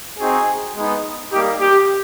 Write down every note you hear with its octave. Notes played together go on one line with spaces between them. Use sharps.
C4 D#4 F#4 G#4
G#3 B3 D#4
G3 A#3 D#4 G4
G4